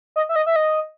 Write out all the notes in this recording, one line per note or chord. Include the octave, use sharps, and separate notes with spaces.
D#5
E5
D#5
E5
D#5